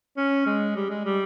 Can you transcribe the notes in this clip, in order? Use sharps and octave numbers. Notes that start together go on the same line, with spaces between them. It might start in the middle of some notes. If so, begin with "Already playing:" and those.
C#4
G#3
G3
G#3
G3